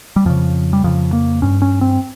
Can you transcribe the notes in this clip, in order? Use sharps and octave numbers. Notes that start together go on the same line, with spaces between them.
G3
F2 C#3 F3
G3
F2 C#3 F3
A#3
G2 C#4
C#4
C4